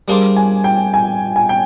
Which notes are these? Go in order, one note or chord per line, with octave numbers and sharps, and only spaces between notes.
G3 A#3 D4 G#4 C5
G#5
G5
G#5
G#5
G5